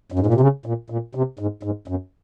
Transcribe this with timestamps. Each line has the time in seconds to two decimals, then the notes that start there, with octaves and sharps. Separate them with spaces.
0.12 F#2
0.19 G#2
0.26 A#2
0.34 C3
0.40 C#3
0.66 A#2
0.90 A#2
1.15 C3
1.39 G#2
1.63 G#2
1.88 F#2